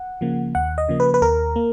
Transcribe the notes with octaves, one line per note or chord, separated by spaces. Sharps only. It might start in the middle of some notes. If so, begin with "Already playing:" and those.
Already playing: F#5
C#3 F3 A#3
D#2 F#5
D#5
C#3 F3 A#3
B4
B4
D#2 A#4
A#3